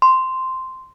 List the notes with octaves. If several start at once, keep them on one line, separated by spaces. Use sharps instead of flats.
C6